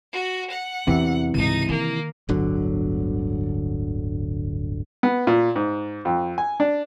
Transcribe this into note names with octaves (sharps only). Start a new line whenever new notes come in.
F#4
F#5
E2 C3 E3
C#2 G#2 D#4 D#7
D#3 A#3
D1 G1 D3 F#3
B3
A#2
G#2
F2
G#5
D4